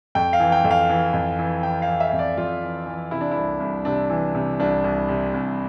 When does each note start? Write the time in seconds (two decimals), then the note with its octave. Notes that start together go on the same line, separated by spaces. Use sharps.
0.15 F2 G5
0.33 F5
0.40 E3
0.52 G5
0.64 F2
0.71 F5
0.89 E3
1.13 F2
1.39 E3
1.63 E3 G5
1.82 F5
1.88 E3
2.00 E5
2.13 F2
2.19 D5
2.37 F2 F4
2.63 E3
2.86 E3
3.11 C3 E4
3.21 D4
3.31 C2 E4
3.60 C2
3.85 C3 D4
4.10 E3
4.35 C3
4.60 C2 D4
4.84 C2
5.08 C3
5.34 C2